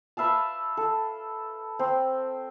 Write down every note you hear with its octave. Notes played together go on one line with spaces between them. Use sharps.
B4 E5 F5 A5
A4
C4